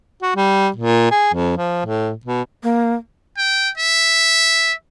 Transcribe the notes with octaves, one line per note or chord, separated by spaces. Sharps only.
F#4
G3
A#2
G#4
F2
F3
A2
B2
A#3
G5
E5